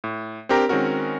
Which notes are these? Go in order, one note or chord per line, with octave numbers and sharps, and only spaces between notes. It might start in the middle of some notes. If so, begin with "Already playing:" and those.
A2
C4 D4 G4 A#4 A#5
D#3 G#3 C4 C#4 F#4 A#4